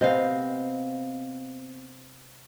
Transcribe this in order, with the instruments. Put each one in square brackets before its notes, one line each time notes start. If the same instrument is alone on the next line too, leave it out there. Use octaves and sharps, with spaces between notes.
[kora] C3 B3 C4 [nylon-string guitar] D#5 F5